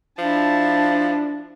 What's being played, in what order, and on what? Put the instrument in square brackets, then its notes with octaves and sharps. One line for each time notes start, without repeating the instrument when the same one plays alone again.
[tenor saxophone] F3 [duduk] D4 [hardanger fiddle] E4 A5